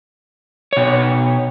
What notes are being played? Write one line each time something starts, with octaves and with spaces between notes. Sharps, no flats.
B2 C#5